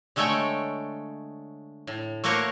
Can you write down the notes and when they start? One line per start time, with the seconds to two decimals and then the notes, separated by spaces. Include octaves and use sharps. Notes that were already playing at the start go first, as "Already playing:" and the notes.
0.16 D3 G#3 A3 A4 C#5 G5
1.87 A2
2.24 A3 A#3 F#4 A#4 C5 C#5